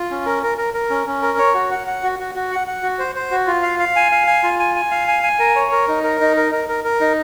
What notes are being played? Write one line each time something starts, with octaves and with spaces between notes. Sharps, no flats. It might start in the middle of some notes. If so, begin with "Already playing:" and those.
Already playing: F4
C#4
A#4
A#4
A#4
A#4
C#4
C#4
A#4
C#5
F#4
F#5
F#5
F#4
F#4
F#4
F#5
F#5
F#4
C5
C5
F#4
F4
F5
F5
G#5
F5
G#5
F4
G#5
G#5
F5
G#5
G#5
A#4
C#5
A#4
D#4
A#4
D#4
A#4
A#4
A#4
A#4
D#4